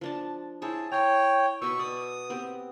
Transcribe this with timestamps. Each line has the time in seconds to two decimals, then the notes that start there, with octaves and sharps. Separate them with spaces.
0.01 F3 D4 A5
0.62 E4 G#4 C5 C#5 A5
0.92 C#5 G5 A#5 C6
1.62 B2 D#5 B5 C#6 E6
1.79 D5 D#6
2.30 B3 C4 G4